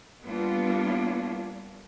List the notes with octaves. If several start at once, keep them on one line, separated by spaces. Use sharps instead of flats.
G3 A#3 B3 D4 F4